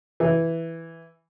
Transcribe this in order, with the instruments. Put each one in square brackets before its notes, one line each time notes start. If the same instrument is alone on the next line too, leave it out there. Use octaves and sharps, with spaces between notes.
[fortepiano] E3